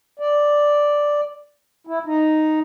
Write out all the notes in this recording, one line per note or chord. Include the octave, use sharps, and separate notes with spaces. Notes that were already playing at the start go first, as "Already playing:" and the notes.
D5
E4
D#4